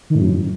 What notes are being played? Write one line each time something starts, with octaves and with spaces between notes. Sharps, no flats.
D#3
A2
F#2